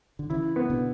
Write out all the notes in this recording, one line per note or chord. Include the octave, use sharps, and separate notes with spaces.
D3
C#3 E3 E4
B3
B2 D3